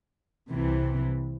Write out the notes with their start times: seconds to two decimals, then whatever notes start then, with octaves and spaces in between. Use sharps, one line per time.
0.52 C2 C3 E3